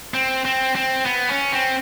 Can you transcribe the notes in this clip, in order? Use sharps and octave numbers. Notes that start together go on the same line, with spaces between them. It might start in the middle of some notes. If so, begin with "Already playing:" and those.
C4
C4
C4
B3
C#4
C4